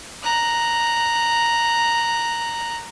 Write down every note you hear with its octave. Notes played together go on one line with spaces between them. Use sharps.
A#5 F#6